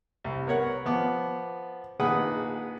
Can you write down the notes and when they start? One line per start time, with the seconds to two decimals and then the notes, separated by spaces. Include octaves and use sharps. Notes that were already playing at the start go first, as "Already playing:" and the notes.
0.24 C2
0.47 B3 A#4 C#5 F#5
0.86 F3 B3 D6
2.00 A#1 D#3 G#4 B4 F#5 D#6